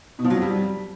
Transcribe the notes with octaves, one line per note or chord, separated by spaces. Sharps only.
B2
F3
F#3
F2
G3